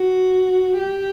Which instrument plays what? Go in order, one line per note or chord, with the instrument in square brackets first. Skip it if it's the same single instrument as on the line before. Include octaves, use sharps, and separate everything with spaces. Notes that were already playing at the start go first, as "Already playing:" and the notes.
Already playing: [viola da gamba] F#4
G4